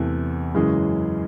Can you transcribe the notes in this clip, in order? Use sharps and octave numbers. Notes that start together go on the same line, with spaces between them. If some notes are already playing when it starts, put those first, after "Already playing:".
Already playing: E2 C3 E3 A3
F#2 C#3 E3 G#3